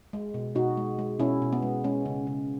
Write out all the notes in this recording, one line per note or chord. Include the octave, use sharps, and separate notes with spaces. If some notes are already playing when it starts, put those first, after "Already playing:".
G#3
B2
B2 D#4 F#4
G#3
G#3
B2 C#4 E4
B2
B3
G#3
G#3 C#4
C#3
C#3